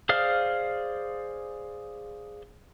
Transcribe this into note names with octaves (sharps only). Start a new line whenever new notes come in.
G#4 C5 D5 F5 F6